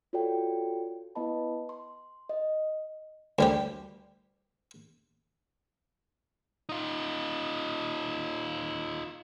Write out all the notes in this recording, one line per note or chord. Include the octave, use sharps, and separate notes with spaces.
F4 F#4 A4 C#5 D5 G5
B3 E4 B4 D#5 A5 B5
C6
D#5
D2 G3 G4
D#4 F4